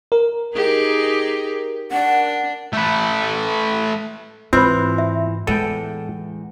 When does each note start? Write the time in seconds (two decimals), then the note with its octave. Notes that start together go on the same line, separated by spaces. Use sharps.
0.12 A#4
0.53 D#4 G4 G#4
1.92 D4 F#5
2.73 A3 B4
4.53 G#2 E3 C4 F4 B4 C5
4.98 E5
5.47 E2 A2 G#3 A4 G5 A5